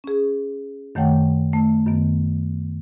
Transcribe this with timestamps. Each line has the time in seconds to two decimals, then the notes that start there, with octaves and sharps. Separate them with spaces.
0.04 C#4 G#4
0.95 F#2 D#3 A3 C#5 F#5 G5
1.53 A3
1.86 F#2 D#3 B3